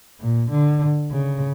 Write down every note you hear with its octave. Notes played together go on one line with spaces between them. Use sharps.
A#2
D3
C#3